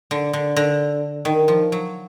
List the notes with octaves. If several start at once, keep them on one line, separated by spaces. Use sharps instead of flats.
D3
D3
D3
D#3
F3
F#3